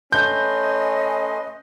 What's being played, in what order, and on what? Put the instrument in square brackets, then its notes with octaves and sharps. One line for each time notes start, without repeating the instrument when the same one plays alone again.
[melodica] A3 B4 C6 [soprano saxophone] C#4 [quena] D#5 [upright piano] G6